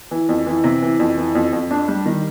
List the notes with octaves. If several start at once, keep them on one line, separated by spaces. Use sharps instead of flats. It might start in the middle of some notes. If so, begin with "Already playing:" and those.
E3
F2
E3
C3
E3
F2
E3
F2
F2
D4
G3
D#3